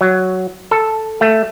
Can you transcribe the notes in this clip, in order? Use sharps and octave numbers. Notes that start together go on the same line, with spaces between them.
F#3
A4
A3